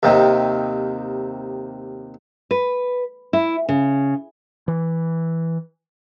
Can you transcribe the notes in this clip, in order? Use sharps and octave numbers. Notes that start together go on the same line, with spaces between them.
D#2 C3 D#3
B4
E4
C#3
E3